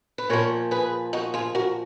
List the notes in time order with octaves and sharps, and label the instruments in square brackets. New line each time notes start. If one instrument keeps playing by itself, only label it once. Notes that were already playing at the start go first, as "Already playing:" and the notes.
[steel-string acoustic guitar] B4
A#2 F3 A#4 C#5
G#4 B4
D#4 F#4
F4 G#4
F#4 A#4